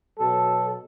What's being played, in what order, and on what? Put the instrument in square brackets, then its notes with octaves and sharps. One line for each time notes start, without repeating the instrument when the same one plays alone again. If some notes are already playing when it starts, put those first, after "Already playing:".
[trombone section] B2 F#3 A4